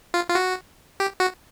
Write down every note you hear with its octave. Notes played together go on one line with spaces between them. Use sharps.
F4
F4
F#4
G4
F#4